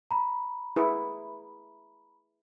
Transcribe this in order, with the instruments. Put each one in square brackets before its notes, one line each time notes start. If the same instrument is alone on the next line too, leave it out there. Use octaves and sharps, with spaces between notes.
[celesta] A#5 B5
[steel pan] E4 G#4 B4